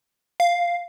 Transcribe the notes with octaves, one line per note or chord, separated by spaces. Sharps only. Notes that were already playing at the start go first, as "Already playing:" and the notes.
F5